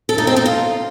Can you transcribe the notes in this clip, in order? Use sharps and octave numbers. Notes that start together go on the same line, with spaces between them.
A4
D#4
C4
D#4
F4